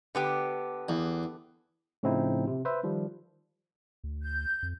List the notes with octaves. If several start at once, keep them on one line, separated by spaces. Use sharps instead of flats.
D3 B3 G4
E2
A2 C#3 F3 C4 D#4 E4
C3
B4 C5 E5
D#3 F3 G3
D2
G6
F2